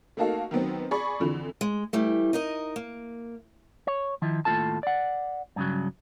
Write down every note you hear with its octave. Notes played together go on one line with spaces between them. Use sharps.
A3 A#3 D#4 F#4 A4 F5
D#3 F#3 B3 C4
G#4 D5 B5 C#6
F2 D3 E3
G#3
E3 G3 A3
D#4 A#4 D#5
A#3
C#5
D#3 F3 E4
D#2 A2 A3 F4 A4 A5
D5 F#5
G2 C#3 F#3